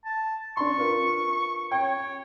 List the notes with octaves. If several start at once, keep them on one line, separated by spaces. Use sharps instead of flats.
A5
D4 C6 C#6
F4 A#4 B4
C#5 G5